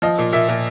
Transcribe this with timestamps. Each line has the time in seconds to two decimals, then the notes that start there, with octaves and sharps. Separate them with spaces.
0.02 F3 D#5
0.18 A#2
0.32 A#2 E5
0.49 A#2